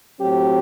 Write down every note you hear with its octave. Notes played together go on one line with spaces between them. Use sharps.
A2 F#3 C4 G4